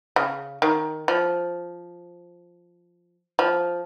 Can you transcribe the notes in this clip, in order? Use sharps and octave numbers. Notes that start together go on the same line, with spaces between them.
C#3
D#3
F3
F3